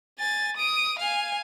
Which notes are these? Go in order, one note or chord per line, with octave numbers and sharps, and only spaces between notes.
G#5 A6
D#6 D7
F5 G#5